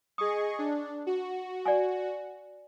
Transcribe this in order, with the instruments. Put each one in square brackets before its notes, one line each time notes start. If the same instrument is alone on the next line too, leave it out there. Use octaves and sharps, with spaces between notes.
[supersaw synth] G#4 D#5 C#6 [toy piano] D#6
[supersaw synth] D4
F#4
[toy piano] D5 F#5 G#5